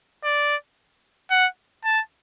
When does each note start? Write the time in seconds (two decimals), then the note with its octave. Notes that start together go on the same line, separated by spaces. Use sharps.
0.24 D5
1.31 F#5
1.84 A5